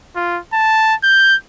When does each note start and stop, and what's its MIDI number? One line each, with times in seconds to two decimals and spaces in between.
0.16 0.39 65
0.53 0.94 81
1.03 1.35 91